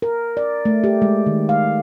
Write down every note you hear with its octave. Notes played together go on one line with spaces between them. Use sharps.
A#4
D5
A3
G4
G#3
D#3
F5